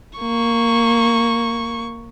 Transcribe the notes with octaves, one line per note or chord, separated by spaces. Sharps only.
A#3 C#6